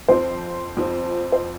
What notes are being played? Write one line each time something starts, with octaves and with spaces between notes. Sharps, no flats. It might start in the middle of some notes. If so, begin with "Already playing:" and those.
F2 F3 C4 C5
F2 F3 C4
C5